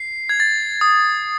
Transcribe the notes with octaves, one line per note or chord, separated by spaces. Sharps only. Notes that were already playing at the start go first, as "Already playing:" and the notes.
Already playing: C7
G#6
A6
D#6